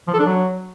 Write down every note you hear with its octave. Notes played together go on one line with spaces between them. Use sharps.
F3
A4
D4
F#3